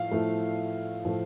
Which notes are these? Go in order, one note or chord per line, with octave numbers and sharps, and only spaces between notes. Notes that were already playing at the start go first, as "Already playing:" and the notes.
Already playing: A2 F3 F5
A2 F3 A3
A2 F3 A3